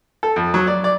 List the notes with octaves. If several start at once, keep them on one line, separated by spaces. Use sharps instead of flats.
A4
F2
F#3
D5
D5